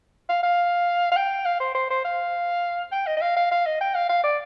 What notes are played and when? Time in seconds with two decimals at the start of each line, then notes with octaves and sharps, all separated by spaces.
0.29 F5
0.43 F5
1.11 F5
1.17 G5
1.45 F5
1.60 C5
1.75 C5
1.90 C5
2.05 F5
2.92 G5
3.07 D#5
3.17 D#5
3.21 F5
3.37 F5
3.51 F5
3.66 D#5
3.81 G5
3.95 F5
4.09 F5
4.24 D5